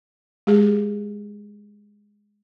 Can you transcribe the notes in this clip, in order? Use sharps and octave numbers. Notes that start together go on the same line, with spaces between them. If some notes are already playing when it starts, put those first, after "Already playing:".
G#3 G4 G#4